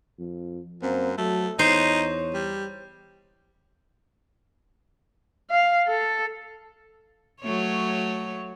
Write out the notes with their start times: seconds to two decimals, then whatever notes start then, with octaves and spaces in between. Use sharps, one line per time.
0.19 F2
0.82 F#2 A#3 C4
1.18 F#3 A3 A4
1.59 E2 D#4 C5 C#5
2.34 G3
5.50 F5
5.88 A4
7.42 F#3 A3 C#5